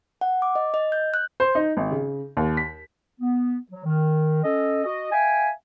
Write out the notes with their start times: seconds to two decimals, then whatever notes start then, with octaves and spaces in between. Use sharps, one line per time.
0.21 F#5
0.42 D6
0.55 D#5
0.74 D#5
0.92 G6
1.14 F#6
1.40 C5
1.55 D#4
1.77 G#1
1.91 C#3
2.37 D#2
2.57 B6
3.20 B3
3.71 F#3
3.85 D#3
4.43 C#4 A4 D#5
4.84 F#4 D#5
5.12 E5 F5 G5 G#5